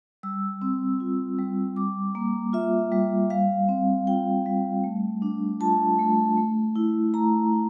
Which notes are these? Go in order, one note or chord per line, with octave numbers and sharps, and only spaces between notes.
G3 E6
C4
F4
G3
G3 D6
A#3
F4 E5
G3
G3 F5
C4
F4 G5
G3
A3
D4
F4 A5
A3
A3
E4
A3 A#5
E4